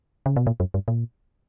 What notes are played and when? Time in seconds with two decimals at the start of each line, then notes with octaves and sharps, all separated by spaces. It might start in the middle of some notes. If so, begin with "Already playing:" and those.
0.26 C#3
0.36 B2
0.47 A#2
0.60 F#2
0.74 G2
0.88 A#2